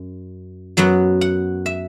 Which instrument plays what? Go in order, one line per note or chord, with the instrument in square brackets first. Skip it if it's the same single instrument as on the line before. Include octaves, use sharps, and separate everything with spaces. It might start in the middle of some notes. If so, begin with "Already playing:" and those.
Already playing: [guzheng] F#2
F#2 F#3 B3 F#5
F#5
E5